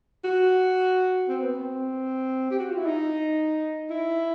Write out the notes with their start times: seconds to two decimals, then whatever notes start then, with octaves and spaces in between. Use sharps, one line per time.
0.24 F#4
1.29 C4
1.43 B3
1.55 C4
2.51 G4
2.59 F#4
2.69 F4
2.77 E4
2.86 D#4
3.91 E4